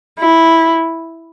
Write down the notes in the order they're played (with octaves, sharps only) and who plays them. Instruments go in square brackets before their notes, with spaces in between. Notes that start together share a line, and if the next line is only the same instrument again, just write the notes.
[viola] E4